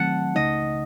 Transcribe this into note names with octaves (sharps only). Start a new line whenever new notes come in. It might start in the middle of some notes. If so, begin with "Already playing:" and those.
Already playing: D#3 F#3 A3 C4 F#5 A5
C#2 C#3 A3 D#4 D#5